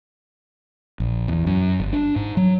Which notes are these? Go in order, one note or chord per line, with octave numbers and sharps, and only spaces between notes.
A#1
E2
F#2
G1
D4
G#2
F#3